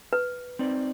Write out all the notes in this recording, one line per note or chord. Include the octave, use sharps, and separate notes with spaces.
B4
C4 D#4 D5